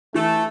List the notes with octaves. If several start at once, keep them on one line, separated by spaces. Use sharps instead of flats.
E3 A3 A4